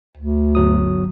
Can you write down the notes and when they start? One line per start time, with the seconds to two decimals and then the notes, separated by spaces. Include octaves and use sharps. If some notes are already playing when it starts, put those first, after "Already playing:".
0.18 D2
0.55 G1 F#3 D#6